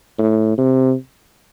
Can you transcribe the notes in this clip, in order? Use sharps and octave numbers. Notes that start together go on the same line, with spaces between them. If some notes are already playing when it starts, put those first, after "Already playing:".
A2
C3